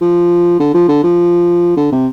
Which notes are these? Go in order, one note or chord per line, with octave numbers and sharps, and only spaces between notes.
F3
D3
F3
D3
F3
D3
C3